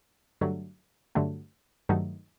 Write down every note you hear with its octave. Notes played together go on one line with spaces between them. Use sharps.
G2 D3 F#3 A3
G2 D3 F#3 A3
G2 D#3 F#3 A3 D#4